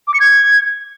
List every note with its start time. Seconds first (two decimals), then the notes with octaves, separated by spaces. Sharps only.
0.08 D6
0.14 C#7
0.20 G#6